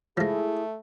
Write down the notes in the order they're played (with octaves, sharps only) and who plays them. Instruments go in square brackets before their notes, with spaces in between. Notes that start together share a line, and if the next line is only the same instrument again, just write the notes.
[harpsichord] F3 G#3 [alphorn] A3 [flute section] E4 G#4